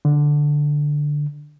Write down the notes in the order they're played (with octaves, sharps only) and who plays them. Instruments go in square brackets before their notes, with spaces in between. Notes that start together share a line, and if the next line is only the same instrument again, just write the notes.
[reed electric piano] D3